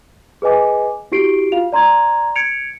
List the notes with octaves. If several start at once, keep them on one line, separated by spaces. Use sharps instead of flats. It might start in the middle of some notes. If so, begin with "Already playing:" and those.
G#4 B4 D#5 G#5 D6
E4 F#4 G4 C7 D7
F4 F5 F7
D5 A#5 C6 G#6
G#6 C#7 D7 F7